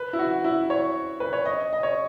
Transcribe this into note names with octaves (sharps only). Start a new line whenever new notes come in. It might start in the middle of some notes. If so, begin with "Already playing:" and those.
Already playing: B4
E4
F#4
E4
C#5
B4
C#5
D#5
D#5
C#5